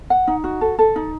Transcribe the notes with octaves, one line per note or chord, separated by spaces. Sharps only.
F#5
D#4
F#4
A4
A4
D#4